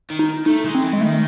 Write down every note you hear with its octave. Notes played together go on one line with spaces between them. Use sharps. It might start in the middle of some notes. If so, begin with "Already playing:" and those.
D#3
D#4
A3 D#4
G#3
C4
E3
G#3
D#3 A3